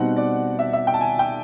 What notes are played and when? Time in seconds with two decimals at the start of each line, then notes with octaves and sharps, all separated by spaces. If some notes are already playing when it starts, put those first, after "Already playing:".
Already playing: B2 G3 C4 D#4 F#5
0.16 D5
0.59 E5
0.73 E5
0.87 G5
0.94 A5
1.01 G#5
1.19 G5